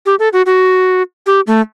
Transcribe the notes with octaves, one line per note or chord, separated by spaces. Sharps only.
G4
A4
F#4
F#4
G4
A3